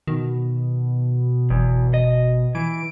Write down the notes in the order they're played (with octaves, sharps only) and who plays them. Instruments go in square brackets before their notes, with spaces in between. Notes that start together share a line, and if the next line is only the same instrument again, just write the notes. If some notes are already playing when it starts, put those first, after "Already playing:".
[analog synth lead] B2 [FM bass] D#3
[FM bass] F#1 [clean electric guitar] E2
[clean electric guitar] D#5
[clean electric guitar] E3 [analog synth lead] D7